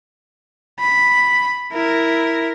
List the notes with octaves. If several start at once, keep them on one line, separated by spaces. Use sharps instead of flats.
B5
E4 A#4